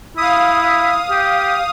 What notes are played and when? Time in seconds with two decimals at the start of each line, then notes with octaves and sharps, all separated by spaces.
0.17 E4 F5 D#6
1.11 G4